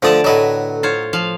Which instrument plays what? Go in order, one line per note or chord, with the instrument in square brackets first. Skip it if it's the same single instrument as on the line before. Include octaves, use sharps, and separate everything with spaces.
[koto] D3 D5 A5 [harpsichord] F3 A3 D#6
[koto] A2 B4 E5 [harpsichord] F#3 D#5
[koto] F4 C5 C#5
F3 F5